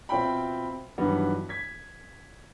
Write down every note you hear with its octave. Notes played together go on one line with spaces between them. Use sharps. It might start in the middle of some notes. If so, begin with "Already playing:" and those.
B2 C4 F4 E5 G5 B5
G2 D#3 E3 F#3 G3 B3
G#6 B6